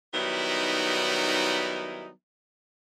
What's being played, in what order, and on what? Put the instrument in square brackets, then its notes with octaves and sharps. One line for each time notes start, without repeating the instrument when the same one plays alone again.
[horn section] D#3 F#3 G3 B3 D#4 E4